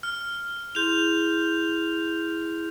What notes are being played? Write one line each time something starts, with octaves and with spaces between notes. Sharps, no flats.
F6
E4 G#4 C6 G6 F7